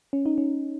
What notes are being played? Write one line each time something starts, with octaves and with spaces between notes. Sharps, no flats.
C#4
D#4
C#4